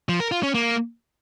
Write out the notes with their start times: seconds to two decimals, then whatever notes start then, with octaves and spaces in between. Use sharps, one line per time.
0.09 F3
0.20 A#4
0.32 F4
0.43 C#4
0.55 A#3